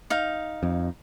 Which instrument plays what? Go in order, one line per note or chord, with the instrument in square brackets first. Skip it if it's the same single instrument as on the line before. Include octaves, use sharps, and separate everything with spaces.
[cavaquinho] D#4 F5
[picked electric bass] F2